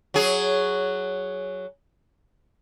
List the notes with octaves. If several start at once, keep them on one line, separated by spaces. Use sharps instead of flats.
F#3 G#4